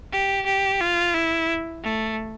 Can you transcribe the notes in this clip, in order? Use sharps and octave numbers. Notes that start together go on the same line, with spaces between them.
G4
G4
F4
E4
A3